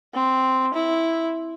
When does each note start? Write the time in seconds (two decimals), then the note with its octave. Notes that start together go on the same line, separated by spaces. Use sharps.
0.14 C4
0.74 E4